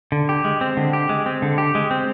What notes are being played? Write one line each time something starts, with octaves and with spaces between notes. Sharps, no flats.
D3
G4
G#3
C4
D3
G4
G#3
C4
D3
G4
G#3
C4